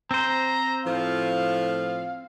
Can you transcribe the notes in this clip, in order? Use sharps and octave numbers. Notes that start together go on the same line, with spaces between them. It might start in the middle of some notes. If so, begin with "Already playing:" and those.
C4 C5 A#5
A2 F3 F5